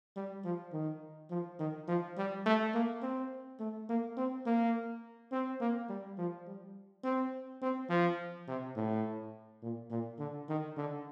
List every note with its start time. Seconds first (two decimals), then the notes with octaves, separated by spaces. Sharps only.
0.16 G3
0.45 F3
0.73 D#3
1.30 F3
1.60 D#3
1.88 F3
2.17 G3
2.46 A3
2.74 A#3
3.03 C4
3.60 A3
3.89 A#3
4.17 C4
4.46 A#3
5.32 C4
5.61 A#3
5.89 G3
6.18 F3
6.47 G3
7.04 C4
7.62 C4
7.90 F3
8.48 C3
8.76 A2
9.62 A#2
9.90 A#2
10.19 D3
10.49 D#3
10.77 D3